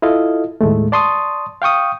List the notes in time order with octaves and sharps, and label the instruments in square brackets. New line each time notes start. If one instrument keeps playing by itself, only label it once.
[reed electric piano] E4 F4 A4 D#5 F5
D#2 A2 G#3 A3
D5 A5 C6 C#6 D#6
F5 G5 C#6 D#6